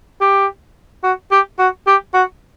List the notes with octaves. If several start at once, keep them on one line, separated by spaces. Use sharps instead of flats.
G4
F#4
G4
F#4
G4
F#4